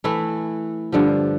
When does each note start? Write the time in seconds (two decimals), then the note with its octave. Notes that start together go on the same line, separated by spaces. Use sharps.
0.04 E3 A3 E4
0.92 G2 D3 F3